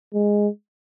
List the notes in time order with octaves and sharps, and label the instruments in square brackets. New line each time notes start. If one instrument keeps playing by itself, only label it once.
[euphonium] G#3